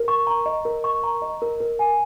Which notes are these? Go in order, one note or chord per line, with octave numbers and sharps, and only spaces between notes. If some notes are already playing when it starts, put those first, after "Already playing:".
Already playing: A#4
C#6
A#5
D#5
A#4
C#6
A#5
D#5
A#4
A#4
G#5